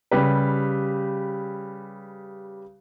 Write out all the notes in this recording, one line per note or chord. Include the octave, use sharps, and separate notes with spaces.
C#3 G3 G4 B4